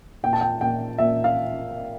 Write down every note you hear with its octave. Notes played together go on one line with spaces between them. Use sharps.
A#2 G5
A5
G5
A#2 G5
A#2 E5
F5